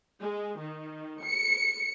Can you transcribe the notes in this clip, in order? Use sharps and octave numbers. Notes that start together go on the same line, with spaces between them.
G#3
D#3
C#7